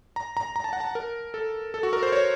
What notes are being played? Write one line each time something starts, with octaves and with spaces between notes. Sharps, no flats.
A#5
A#5
A#5
A5
F#5
A5
A#4
A4
A4
F#4
A#4
C5
C#5